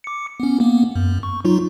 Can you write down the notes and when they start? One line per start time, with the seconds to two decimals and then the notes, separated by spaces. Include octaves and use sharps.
0.04 D6 C#7
0.40 B3 C#4
0.60 A#3 B3
0.95 F#2
1.23 C#6
1.45 F#3 D#4 F4